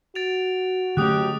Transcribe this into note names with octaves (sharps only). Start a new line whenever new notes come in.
F#4 A6 D7 F7
D3 F#3 G#3 A3 C#4 G4 D#6 F#6